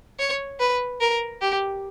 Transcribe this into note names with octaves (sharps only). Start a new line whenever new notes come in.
C#5
B4
A#4
G4